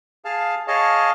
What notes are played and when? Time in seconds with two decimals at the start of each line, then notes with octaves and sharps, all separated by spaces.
0.25 G#4 F5 A5
0.68 G#4 C#5 D#5 F5 A5